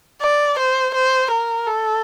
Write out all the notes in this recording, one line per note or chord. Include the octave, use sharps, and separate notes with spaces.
D5
C5
C5
A#4
A4